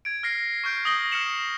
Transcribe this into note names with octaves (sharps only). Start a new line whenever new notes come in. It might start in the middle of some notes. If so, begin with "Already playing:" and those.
G#6 D7
F6 A#6 C7
C#6 F6 G6 D7
D#6 F6 A#6 F#7 G7
F6 C7 C#7 E7 F#7